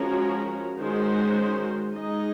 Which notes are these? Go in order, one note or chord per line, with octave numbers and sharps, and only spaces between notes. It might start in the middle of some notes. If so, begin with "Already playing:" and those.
Already playing: F3 G#3 C#4 F#4 A#4
D#3 G#3 C#4 F#4 C5
G#3 D#4 G#4 D#5